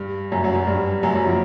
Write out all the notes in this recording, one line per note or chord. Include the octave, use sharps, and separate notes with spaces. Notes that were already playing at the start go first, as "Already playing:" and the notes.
Already playing: G2 G3
F#2 F#3
F#2 F#3
F#2 F#3
G2 G3
F#2 F#3
F#2 F#3
F3